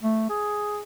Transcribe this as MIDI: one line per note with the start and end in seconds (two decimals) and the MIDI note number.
0.03 0.25 57
0.30 0.82 68